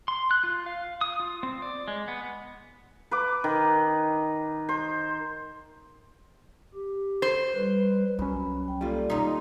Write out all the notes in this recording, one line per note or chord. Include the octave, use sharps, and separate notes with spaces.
C6
F#6
F4
F5
D#6
F4
C4
D5
G#3
B3
B4 D6
D#3
C5
G4
C5
G3 B4
C2 F#2 C#4 B5
G5
G3 A#3 F4 A4 D5
D#2 D#4 C6